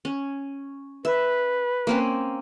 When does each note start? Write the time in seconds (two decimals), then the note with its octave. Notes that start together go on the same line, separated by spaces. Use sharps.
0.05 C#4
1.05 B4 E5
1.87 A#3 C4 C#4